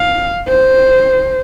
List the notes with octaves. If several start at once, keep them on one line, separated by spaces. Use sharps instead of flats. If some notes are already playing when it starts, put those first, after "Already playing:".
Already playing: F5
C5